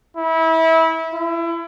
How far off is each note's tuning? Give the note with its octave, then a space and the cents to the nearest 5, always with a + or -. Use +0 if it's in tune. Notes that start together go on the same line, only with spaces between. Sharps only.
E4 -25
E4 +30